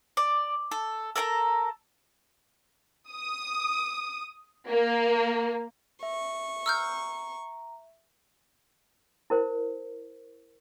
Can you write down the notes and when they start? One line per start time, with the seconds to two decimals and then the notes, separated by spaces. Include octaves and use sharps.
0.17 D5
0.71 A4
1.16 A4 A#4 F#5 A#5
3.11 D#6
4.69 A#3
6.03 E5 C#6
6.66 A#5 E6 F6 G6
9.30 E4 A#4 C5